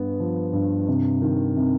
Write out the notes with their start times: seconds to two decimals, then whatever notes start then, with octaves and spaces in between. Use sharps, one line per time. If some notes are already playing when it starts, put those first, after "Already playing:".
Already playing: G2 B3
0.20 F3
0.53 G2
0.88 C3
1.22 D#3
1.57 C3